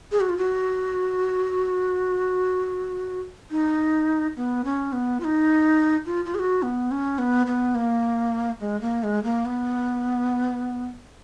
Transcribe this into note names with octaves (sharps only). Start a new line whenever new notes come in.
G#4
F#4
F4
F#4
D#4
B3
C#4
B3
F4
D#4
F4
F4
G#4
F#4
B3
C#4
B3
B3
A#3
G#3
A#3
G#3
A#3
B3